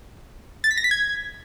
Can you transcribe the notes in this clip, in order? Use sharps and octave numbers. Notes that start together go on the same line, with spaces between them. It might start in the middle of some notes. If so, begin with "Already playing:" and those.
A6
B6
A#6
B6
G#6